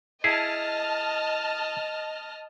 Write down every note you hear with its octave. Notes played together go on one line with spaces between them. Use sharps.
E4 G#4 D#5 A5 F6